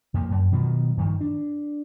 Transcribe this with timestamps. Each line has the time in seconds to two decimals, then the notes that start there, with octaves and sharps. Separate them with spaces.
0.14 F2 F3 A#3
0.31 F#2
0.52 B2 D#3 F3 F#3
0.97 G2 D#3 F3
1.21 D4